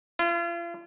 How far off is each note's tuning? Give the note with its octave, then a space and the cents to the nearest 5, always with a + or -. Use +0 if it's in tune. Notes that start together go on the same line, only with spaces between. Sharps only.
F4 -40